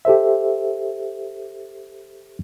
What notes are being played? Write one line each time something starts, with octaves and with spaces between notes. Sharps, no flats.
G4 A4 C5 E5